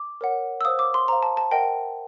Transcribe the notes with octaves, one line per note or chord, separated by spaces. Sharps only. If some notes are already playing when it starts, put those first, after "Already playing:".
Already playing: D6
A#4 C#5 F#5
E6
C5 F5 D#6
D6
C6
C5 F5 A#5
A5
A5
A#4 D#5 F#5 G5